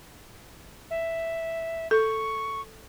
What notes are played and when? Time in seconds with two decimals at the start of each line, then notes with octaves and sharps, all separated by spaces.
0.90 E5
1.91 A4 C#6